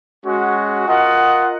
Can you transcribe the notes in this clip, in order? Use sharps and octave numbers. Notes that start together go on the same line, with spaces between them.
G#3 C#4 F#4
F4 A#4 D#5 F#5